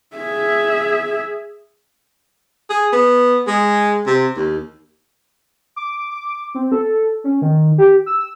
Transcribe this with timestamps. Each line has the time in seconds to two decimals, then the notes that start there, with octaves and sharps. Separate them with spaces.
0.16 G#4 E5
2.70 G#4
2.93 B3
3.47 G#3
4.07 C3
4.36 D#2
5.76 D6
6.11 D6
6.55 C4
6.72 A4
7.24 C#4
7.42 D#3
7.78 G4
8.06 E6